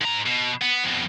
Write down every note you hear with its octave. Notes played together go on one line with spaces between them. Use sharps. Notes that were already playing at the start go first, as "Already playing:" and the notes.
G#2 A#5
B2
B3
F2 B2